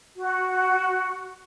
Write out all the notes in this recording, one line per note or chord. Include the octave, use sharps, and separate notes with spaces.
F#4